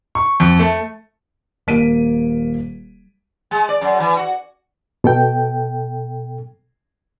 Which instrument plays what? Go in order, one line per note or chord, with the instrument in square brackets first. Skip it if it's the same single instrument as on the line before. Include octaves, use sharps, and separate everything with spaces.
[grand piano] C#6
F2
A3
[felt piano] D#1 A#3 B6 D7 D#7
[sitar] G#3
D5
F#2
E3
F#4
[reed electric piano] B2 A4 G5